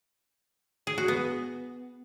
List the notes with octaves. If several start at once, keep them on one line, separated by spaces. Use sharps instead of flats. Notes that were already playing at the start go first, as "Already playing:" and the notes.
G#4
F#4
B3